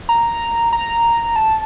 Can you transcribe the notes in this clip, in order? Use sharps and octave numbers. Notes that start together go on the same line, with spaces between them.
A#5
A#5
A5